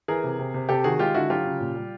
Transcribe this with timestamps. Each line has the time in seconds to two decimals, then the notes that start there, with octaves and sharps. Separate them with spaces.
0.08 E3 G#4 A#4
0.24 C3
0.39 C3
0.54 C3
0.69 C3 G4 A4
0.84 D#3 F#4 G#4
0.99 G#3 F4 G4
1.14 D3 E4 F#4
1.30 F#3 F4 G4
1.45 C#3
1.60 A#2
1.75 G3